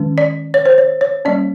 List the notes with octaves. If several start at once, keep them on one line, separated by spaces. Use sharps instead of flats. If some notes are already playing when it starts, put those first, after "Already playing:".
Already playing: D#3 G#3 C#4
D5
C#5
C5
C#5
C#5
G3 A#3 C#4 D5